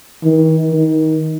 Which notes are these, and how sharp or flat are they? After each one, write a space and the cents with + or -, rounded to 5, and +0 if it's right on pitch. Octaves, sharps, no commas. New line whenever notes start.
D#3 +40
D#3 +20